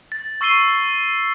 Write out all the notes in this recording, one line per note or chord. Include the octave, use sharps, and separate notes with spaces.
A6
C#6 E6 A6 C7 D#7 G7